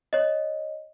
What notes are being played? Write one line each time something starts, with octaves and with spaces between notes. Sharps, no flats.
C#5 D#5